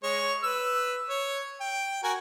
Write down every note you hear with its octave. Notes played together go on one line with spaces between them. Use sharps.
G#3 C#5
B4 E6
C#5
G5
F#4 A#4 G#5